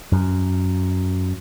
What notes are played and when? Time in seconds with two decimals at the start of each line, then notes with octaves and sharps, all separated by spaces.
0.12 F#2